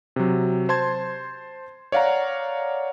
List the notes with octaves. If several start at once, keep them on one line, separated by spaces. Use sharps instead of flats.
C3 F#3
C5 A5 C6 G#6
C#5 D5 F5 F#5 A#5